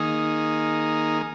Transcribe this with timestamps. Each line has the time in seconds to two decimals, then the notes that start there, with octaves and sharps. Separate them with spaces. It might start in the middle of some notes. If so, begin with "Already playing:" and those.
Already playing: D#3 A#3 D#4 G#4